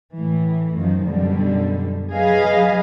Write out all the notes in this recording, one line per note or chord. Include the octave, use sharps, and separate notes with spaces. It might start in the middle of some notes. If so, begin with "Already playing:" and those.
A2 E3
F#2 D#3 F3 F#3
F#2 B2 D3 G3
F#3 G#4 B4 D#5 F5